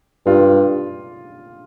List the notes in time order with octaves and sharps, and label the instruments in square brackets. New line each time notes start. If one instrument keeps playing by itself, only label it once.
[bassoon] G2 [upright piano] F4